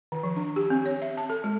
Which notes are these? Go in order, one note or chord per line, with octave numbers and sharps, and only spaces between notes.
D#3
F3
D4
G4
C4
C#5
E5
A5
A4
G#3